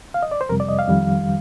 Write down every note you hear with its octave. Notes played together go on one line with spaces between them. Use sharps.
F5
D#5
D5
C5
F2 C3 G3 A#4
D5
D#5
F5
F2 D#3 G3